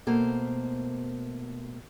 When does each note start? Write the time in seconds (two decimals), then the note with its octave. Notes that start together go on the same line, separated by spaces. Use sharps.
0.07 B2 A3 A#3 C5